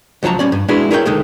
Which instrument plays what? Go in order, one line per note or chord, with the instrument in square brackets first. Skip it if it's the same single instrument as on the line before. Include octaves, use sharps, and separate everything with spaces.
[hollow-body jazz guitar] C#2 F3 F#3 A5 A#5
G3 C#4 D5
G2
G#3 D4 E4 F#4 G#4 B4
E4 G#4 A#4 C#5 D5 G5
D2 D#3 G#3 A3